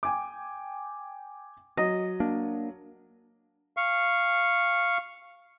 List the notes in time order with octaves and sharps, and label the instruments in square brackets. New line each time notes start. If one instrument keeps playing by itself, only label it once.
[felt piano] G5 G#5 D6
[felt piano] F#3 [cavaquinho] D#5
[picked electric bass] A#3 D4
[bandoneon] F5 C#6